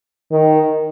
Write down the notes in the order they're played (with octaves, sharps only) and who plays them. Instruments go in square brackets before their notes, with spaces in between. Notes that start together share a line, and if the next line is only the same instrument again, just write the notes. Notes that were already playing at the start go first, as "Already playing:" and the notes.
[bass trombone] D#3